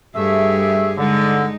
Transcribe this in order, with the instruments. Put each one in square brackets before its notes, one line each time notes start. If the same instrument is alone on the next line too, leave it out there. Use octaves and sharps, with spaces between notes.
[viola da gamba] G2 G3 G#4 [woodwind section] A3 E5
[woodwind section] D3 [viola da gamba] G#3 D#4